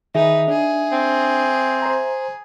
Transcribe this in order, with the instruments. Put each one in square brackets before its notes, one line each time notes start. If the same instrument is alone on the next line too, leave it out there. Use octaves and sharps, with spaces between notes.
[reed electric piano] D#3 G#4 [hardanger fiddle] D#4 B4 [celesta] E5
[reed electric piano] D4 [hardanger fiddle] G#4
[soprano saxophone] C4
[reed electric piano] C5 A#5